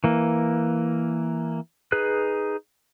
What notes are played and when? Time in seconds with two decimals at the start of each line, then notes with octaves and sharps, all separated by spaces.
0.04 E3 A#3
1.92 D#4 G#4 B4 F#6